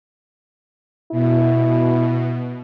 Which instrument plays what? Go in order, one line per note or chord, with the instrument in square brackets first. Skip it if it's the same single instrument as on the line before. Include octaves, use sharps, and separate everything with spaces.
[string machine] B2 [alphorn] E4